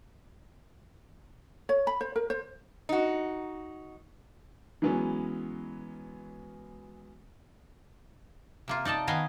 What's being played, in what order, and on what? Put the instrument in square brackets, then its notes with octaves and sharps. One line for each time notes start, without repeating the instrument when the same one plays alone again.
[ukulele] C#5
B5
C5
A#4
C5
[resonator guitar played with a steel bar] D#4 F#4
[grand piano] E3 F#3 G#3 B3 C#4
[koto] C3 A#3 F4
D#4 D5 D#5 A5
D#3 B3 D#5 F5 G#5